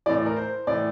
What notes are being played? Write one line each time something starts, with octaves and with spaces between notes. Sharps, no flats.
A2 E3 D5
D5
A#4
C5
A2 E3 D5